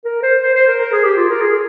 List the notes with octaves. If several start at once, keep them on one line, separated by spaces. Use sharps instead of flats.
A#4
C5
C5
C5
A#4
A#4
G#4
G4
F4
A#4
G#4